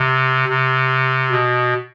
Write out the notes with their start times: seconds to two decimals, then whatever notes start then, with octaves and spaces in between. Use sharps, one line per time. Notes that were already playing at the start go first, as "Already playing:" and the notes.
Already playing: C3
0.49 C3
1.31 B2